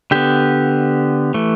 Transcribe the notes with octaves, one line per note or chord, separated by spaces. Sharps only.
D3 B3 G4
E3 A3